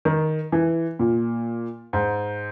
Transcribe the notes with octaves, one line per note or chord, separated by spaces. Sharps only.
D#3
E3
A#2
G#2